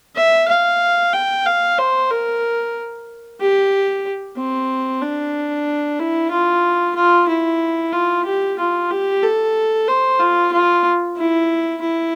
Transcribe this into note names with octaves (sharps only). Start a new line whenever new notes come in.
E5
F5
G5
F5
C5
A#4
G4
C4
D4
E4
F4
F4
E4
F4
G4
F4
G4
A4
C5
F4
F4
E4
E4